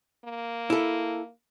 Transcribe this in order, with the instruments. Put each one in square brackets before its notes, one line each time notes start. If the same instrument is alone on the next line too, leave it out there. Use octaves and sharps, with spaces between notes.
[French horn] A#3
[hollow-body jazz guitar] E4 A4